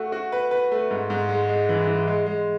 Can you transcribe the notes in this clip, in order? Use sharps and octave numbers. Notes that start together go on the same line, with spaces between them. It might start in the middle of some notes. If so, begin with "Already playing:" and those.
Already playing: A3 F#4
F#4
B4
B4
A3
G#2
G#2
G#3
G#3
E3
E3
G#3
G#3